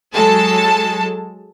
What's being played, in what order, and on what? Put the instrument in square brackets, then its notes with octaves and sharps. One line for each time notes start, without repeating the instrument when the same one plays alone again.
[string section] F#3 G#3 A4 A5